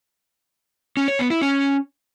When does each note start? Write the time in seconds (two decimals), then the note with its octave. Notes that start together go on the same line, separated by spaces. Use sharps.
0.97 C#4
1.08 C#5
1.19 B3
1.30 E4
1.42 C#4